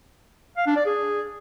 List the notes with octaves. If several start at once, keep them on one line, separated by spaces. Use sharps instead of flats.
F5
D4
D5
G#4